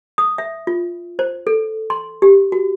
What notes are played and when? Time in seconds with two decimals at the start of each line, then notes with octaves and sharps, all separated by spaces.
0.18 D#6
0.38 E5
0.67 F4
1.19 C5
1.47 A4
1.90 C6
2.22 G4
2.52 F#4